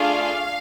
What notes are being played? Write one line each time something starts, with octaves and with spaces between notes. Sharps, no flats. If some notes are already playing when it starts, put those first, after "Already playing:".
Already playing: A3 D4 F4 G#4 F5